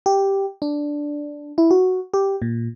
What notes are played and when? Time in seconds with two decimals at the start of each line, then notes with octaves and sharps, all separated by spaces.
0.06 G4
0.62 D4
1.58 E4
1.71 F#4
2.14 G4
2.42 A#2